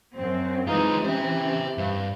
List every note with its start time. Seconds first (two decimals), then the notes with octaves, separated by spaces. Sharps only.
0.15 F#2 C4 C5
0.68 E3 G#3 C4 D#4 F4 B4
1.04 C#4 G4 C5 E5
1.78 G2 F5